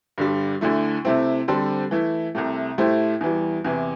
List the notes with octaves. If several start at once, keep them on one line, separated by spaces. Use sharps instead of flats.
G2 D3 G3
D2 D3 A3 E4
C3 A3 C4 E4
D3 G3 C4 A4 C5
E3 A3 E4
C2 C3 A3
A2 A3 E4 G4 C5
E2 E3 G3
E2 C3 E3